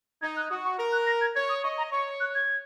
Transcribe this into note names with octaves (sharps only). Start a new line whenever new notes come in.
D#4 G#6
F#6
F#4 D#6
C#6
A#4
F#6
A#6
G#6
C#5 G#6
D#6
D#5 C#6
A#5
C#5 C#6
F#6
G#6